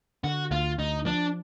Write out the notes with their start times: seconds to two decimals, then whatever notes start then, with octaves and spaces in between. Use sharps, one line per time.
0.24 D3 F#4
0.51 D2 F4
0.79 D2 D#4
1.06 F3 D4